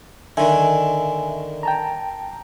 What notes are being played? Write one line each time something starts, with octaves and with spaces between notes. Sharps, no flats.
D3 D#3 E5 G#5
G5 A5 A#5